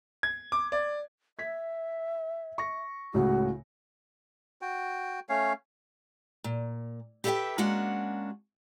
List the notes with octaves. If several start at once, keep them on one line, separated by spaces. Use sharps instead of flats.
G#6
D6
D5
E5 G#6 B6
C#6 A#6
C#2 A2 C#3 F#4
F#4 G5
A3 C#4 C#5 F5
A#2
G4 A4 B4 D#5 E5 G5
G#3 A#3 C#4 D4 F#4 F#5